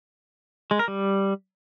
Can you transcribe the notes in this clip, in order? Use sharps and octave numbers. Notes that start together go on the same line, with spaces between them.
G#3
A#4
G3